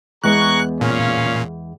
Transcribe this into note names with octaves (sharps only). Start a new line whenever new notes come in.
E2 G#3 B3 G#4 A#5 C#6 F#6
A#2 C#4 F5